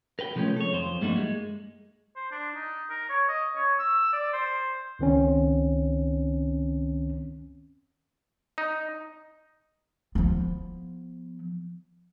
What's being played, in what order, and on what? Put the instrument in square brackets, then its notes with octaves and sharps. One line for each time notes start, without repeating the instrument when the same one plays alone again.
[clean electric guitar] A#4 B4 G5
C3 F3 G#3 A3 C4 C#4
A4 C#5
F2 C5
G2 G3 A3 A#3 D#4 F#4
G#3
[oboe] C5
D4
D#4
A#4
C#5
D#5
C#5
E6
D5
C5
[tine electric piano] C#2 D#3 C4 C#4
[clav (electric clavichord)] D#4
[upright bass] F3 B3